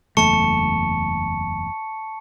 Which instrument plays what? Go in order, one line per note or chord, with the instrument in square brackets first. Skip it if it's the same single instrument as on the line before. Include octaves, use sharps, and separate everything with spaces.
[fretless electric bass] F#1 E2 A3 [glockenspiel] A5 C#6 C#7